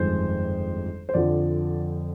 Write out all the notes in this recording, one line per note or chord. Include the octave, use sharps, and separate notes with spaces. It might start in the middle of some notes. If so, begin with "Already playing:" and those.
Already playing: G1 F2 D#3 G#3 C5
C5
F2 D3 F3 D5